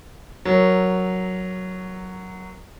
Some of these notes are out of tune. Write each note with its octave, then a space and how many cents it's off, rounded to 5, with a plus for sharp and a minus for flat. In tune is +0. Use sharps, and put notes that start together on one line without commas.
F#3 +0 A#4 +0